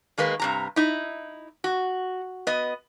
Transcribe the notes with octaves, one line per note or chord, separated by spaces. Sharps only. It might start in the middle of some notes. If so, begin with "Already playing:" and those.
D#3 G#3 A#3 B4
G2 C3 A#5
D#4 E4
F#4
B3 D#5